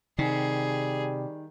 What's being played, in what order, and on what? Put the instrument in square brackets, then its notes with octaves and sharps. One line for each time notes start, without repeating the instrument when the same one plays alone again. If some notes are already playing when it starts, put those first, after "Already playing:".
[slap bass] C3 [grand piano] D#3 [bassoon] G3 [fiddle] G#4